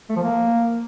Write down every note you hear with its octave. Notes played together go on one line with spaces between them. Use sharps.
A3
F3
A#3